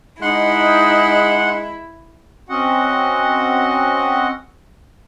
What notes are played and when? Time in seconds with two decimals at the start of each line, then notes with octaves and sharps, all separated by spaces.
0.22 G#3 D#4 E4 F#5 C6 F#6
2.49 C4 C#4 F#4 D#5 F#5